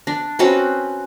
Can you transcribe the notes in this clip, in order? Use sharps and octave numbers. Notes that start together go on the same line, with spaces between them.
D4
C4 C#4 F#4 B4